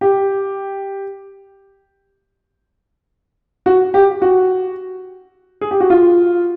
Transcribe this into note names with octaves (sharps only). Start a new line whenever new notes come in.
G4
F#4
G4
F#4
G#4
G4
F#4
F4